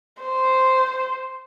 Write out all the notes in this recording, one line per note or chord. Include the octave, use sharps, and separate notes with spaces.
C5